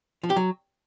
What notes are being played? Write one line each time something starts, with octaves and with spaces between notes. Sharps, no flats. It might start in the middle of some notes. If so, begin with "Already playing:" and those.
F3
G4
F#3